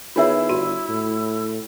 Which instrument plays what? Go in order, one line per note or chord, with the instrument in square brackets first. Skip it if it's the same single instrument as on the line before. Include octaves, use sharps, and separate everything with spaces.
[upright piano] D#3 B3 G#4 [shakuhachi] E4 [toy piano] F4 C#5 E5
[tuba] G1 [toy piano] F#4 [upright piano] D#7
[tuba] A2